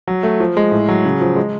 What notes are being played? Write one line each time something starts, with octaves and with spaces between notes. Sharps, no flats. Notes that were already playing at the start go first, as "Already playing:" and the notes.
F#3
A3
F3
G#3
A2
F#3
C#3
F3
G#3